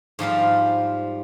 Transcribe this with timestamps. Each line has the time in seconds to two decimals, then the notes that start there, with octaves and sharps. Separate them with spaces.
0.19 G#2 F3 G3 F5